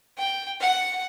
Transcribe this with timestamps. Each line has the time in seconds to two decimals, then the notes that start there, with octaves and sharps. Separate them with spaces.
0.18 G5
0.60 F#5